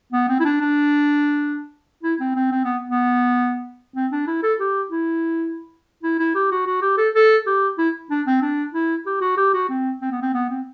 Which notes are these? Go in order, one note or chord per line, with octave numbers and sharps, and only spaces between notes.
B3
C4
E4
D4
D4
E4
C4
C4
C4
B3
B3
C4
D4
E4
A4
G4
E4
E4
E4
G4
F#4
F#4
G4
A4
A4
G4
E4
D4
C4
D4
E4
G4
F#4
G4
F#4
C4
C4
B3
C4
B3
C4